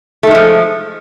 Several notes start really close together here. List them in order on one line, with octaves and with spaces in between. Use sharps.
A3 D#3 G#3 F3